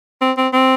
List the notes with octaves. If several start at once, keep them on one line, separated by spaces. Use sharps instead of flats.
C4
C4
C4